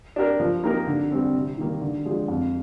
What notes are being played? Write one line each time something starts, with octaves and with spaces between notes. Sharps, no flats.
D4 G4 A#4
F3
A#3 D#4 G4 A#4
D3
G3 C4
C3
D#3 G3 A#3
D3
F3 G#3 D4 G4
F2